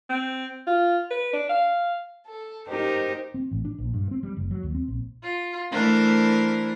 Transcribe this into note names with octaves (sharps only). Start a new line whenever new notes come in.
C4
F4
B4
D4
F5
A4
D#4 G4 A#4 C5
C4
A1
D4
A#1
G2
C4
G3
F#1
F#3
D#2
C4
A#1
F4
E3 A3 D4 A#4 C5